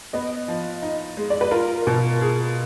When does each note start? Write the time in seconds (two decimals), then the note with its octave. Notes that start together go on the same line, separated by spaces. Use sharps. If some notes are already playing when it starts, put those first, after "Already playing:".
0.13 B3 D#5
0.48 F3
0.83 D#4
1.17 G#3
1.30 D5
1.41 B4
1.51 F4 A#4
1.87 B2
2.21 G#4